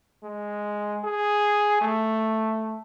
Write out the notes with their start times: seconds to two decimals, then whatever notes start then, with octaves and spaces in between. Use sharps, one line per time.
0.23 G#3
1.04 G#4
1.81 A3